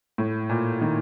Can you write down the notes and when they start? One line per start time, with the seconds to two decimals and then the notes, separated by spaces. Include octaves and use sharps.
0.18 A2
0.50 A#2
0.81 D#3